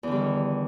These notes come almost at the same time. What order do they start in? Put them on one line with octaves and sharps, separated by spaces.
E2 D3 G3 D#3